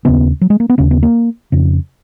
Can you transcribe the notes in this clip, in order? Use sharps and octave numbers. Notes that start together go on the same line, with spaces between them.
D#2 C#3 B3
F#3
G#3
A#3
B3
D#2 C#3 C#4
B3
A#3
F2 C#3